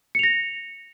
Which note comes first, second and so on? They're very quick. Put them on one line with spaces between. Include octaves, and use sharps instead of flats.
C#7 F7 A#6